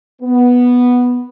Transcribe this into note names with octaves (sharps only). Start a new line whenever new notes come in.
B3